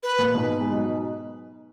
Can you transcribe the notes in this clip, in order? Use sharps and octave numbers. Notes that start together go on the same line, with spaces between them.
B4
A#2
G#2 B2
G#3
F#3